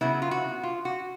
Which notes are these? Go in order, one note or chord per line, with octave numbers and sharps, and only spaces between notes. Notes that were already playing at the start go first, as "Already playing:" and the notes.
C#3 F#3 B3 E4
F4
F#4
F4
F#4